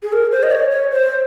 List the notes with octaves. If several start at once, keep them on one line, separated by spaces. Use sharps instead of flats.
G#4
A#4
C5
D#5
C#5
C#5
C5